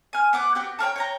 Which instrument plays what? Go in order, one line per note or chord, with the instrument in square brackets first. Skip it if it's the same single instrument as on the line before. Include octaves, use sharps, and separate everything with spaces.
[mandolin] G#5 F6
B3 F#5 D6
B3 F#4 G4
A4 A#4 C#5 G5
C#5 G5 A#5